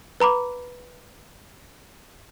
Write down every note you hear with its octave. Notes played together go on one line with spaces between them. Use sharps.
B4 A#5 B5 D6